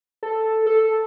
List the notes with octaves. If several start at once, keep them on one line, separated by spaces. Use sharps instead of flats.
A4
A4